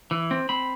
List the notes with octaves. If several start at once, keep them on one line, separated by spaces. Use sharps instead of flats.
E3
C4
C4 B5